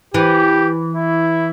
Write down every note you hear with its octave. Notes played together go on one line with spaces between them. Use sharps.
E3 G4
E4